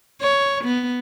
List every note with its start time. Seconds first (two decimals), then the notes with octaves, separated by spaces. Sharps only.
0.21 C#5
0.64 B3